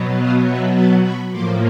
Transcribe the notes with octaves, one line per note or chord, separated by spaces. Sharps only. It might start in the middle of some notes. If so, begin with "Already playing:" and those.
Already playing: B2 F#3 B3
D#5 F5
E5 F#5
A5 B5
B5 C#6
A2 F3 A#3 C6 D6